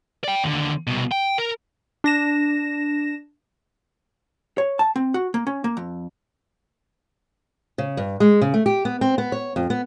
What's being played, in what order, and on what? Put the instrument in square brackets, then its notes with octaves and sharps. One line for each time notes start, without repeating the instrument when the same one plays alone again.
[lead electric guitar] D5 G5
D#2 D3
C2 B2
G5
A#4
[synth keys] D4 A#6 E7
[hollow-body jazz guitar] C#5
A5
C4
F#4
A#3
C#4
A#3
F2
[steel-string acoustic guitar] C#3
G2
G#3
C#3
A3
G4
B3
C4
B3
C#5
F2
B3